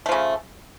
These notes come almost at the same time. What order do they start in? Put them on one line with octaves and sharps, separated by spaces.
A3 F3 C#3